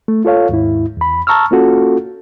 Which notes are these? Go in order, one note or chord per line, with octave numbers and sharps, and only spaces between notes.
A3
F4 A4 C#5 F5
D#2 G#2 E4
E2 B5
A5 A#5 C#6 E6 F6
A#3 C#4 F4 F#4 A4